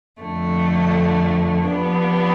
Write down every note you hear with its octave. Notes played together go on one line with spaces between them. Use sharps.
F2 D3 A3
F3 B3 D4 G4